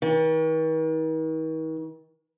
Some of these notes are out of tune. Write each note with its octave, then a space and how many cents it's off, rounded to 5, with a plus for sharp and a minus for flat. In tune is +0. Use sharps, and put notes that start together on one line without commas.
D#3 +45